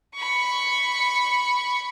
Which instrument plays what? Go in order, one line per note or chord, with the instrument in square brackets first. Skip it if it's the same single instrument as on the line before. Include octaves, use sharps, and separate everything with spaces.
[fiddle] B5 C#6